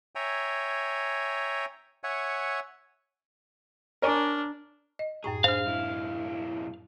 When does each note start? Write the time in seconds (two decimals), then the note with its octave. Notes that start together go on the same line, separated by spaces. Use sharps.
0.15 C#5 E5 G5 G#5 A#5
2.04 C#5 E5 F#5 G#5
4.02 D4 A#4 C#5 G#5
4.99 D#5
5.24 F#2 A2 G#4 C#6
5.44 D4 C5 F5 F6
5.66 B1 E4